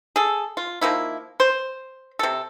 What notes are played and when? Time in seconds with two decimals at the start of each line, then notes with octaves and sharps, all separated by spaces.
0.16 G#4 A4
0.57 F4
0.81 D#3 F3 A#3 E4
1.40 C5
2.19 C3 A4